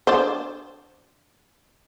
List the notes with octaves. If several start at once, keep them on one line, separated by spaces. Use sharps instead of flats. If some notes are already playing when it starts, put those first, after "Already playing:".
D4 C5